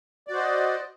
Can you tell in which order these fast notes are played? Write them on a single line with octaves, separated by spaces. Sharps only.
D5 F#4 C5 D#5